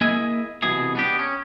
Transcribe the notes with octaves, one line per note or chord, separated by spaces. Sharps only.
A#3 E4 G#4 D#5 E5 G#5
C2 B2 E3 G#4
B3 D4 G4
C#4